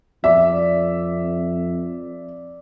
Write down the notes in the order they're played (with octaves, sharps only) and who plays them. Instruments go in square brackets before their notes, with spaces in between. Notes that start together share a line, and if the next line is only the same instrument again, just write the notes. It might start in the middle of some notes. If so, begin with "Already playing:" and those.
[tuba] F2 [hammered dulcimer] D5 [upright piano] E5